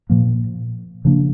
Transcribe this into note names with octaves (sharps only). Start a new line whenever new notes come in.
A#2 F3 A#3
C#3 F3 A#3 D4